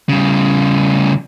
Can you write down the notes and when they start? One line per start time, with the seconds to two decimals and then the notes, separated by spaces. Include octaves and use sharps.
0.09 C#3 G3